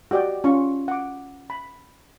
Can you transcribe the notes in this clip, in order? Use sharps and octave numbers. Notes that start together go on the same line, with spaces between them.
F#4 G4 D5 D#5 G5
C#4 F4 C#6
F#5 D6
B5